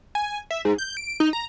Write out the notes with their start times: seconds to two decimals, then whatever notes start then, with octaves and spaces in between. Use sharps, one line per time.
0.15 G#5
0.51 E5
0.65 G#2
0.78 G6
0.97 D7
1.20 D#4
1.33 A#5